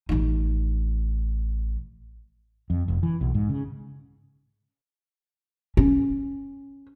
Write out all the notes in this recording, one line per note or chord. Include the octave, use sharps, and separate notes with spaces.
A1 D#4
F2
F1
E3
B1
G#2
C#3
C#4